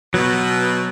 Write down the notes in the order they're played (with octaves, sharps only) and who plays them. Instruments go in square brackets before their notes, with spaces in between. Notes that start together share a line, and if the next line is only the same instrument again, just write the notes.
[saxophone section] B2 [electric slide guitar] F#3